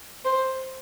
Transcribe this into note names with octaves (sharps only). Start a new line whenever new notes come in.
C5